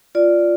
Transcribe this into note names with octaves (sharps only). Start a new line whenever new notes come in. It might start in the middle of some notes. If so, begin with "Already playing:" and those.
F4 D5